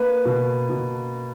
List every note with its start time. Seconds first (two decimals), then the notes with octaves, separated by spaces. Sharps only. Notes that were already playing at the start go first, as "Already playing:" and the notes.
Already playing: A#3 B4
0.25 B2
0.69 B2